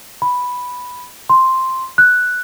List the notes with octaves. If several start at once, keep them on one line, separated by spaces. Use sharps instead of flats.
B5
C6
F#6